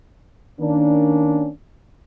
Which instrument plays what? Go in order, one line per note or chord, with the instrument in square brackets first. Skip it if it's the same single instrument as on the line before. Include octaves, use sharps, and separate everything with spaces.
[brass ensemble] D#3 A#3 C#4 D4